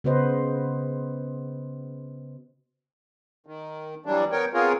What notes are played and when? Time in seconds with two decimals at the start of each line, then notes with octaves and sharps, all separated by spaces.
0.04 C#3 B3 F#4 B4 C5 D#5
3.46 D#3
4.06 E3 F#3 G3 D4
4.32 B3 A#4 C#5 G5
4.54 B3 C4 F4 G#4 A#4 C#5